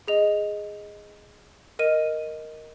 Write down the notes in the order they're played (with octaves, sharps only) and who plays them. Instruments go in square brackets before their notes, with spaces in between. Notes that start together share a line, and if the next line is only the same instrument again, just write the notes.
[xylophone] G#4 D#5 F7
A#4 D#5 D#7